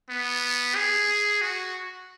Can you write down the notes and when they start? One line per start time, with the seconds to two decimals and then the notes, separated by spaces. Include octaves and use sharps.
0.10 B3
0.76 G#4
1.42 F#4